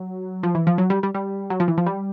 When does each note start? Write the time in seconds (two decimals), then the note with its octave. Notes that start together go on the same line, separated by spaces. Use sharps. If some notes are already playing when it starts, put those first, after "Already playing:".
Already playing: F#3
0.43 F3
0.55 E3
0.67 F3
0.78 F#3
0.90 G3
1.03 G3
1.14 G3
1.50 F#3
1.60 F3
1.68 E3
1.78 F3
1.86 G3